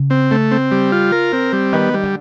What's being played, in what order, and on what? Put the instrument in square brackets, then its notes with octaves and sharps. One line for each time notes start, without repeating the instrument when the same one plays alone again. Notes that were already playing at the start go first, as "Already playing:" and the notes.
Already playing: [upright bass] C#3
[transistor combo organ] C4
A3
C4
G3
F4
A#4
C4
G3
[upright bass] D#3 [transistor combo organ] B3
[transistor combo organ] G3
[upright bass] D3